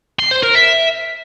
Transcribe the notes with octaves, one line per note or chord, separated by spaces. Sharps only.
C6
C5
A#4
E5